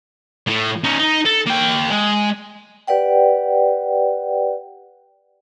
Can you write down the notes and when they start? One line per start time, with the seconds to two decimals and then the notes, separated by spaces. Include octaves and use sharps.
0.47 A2 A3
0.84 C#4 D#4
1.00 D#4
1.25 A4
1.46 A#3 G5
1.90 G#3
2.87 G4 B4 D5 F#5 G5